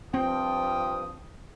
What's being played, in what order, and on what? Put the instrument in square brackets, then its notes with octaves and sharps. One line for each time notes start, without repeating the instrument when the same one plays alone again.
[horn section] G2 F3 [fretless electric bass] C4 [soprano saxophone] G5 [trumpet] D#6